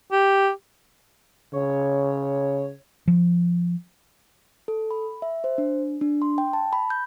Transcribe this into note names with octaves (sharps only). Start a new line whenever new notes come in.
G4
C#3 C#5
F3
A4
B5
E5
C5
D4
D4
C6
G5
A5
B5
G6